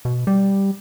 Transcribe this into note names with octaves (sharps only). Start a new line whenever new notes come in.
B2
G3